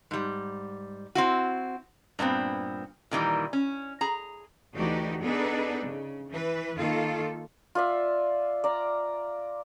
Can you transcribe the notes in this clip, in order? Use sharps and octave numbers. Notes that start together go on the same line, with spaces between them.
G#2 G3
C4 E4 F#4
G2 A#2 B3 C4
A#2 D#3 E3 G3
C#4
G#4 A#5
D2 E3 D4 D#4 F#4 G4
B3 D4 D#4 G#4 A4 B4
C#3
E3 B4
D#3 A#3 F4 A4
F4 D5 E5
D5 A#5